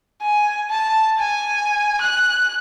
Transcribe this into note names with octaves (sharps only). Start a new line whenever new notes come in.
G#5
A5
G#5
F#6